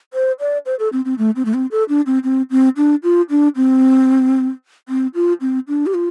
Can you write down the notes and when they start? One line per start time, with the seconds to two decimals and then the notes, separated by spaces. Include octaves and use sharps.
0.14 C5
0.40 D5
0.66 C5
0.79 A4
0.93 C4
1.05 C4
1.18 A3
1.36 C4
1.45 A3
1.54 C4
1.71 A4
1.89 D4
2.06 C4
2.24 C4
2.51 C4
2.77 D4
3.03 F4
3.30 D4
3.56 C4
4.89 C4
5.15 F4
5.41 C4
5.68 D4
5.86 G4
5.94 F4